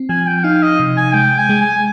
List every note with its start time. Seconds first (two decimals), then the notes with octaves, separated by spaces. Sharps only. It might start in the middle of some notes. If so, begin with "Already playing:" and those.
Already playing: C4
0.09 F3 G#5
0.27 G5
0.44 D#4 F5
0.62 D#5
0.80 C3
0.97 G#5
1.14 G#3 G5
1.38 G#5
1.49 G#3
1.61 G#5